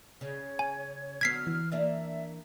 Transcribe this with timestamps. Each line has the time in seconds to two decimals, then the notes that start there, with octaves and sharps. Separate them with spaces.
0.21 C#3 C#5
0.59 G#5
1.21 D3 F#3 B3 F6 G#6 B6 C7
1.47 E3
1.72 A#3 D4 D5 E5